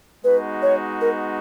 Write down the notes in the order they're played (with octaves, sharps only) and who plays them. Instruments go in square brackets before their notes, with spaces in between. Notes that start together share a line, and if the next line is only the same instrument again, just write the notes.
[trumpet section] G#3 B3 D#4 F#4 [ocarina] B4
[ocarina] C#5
A#4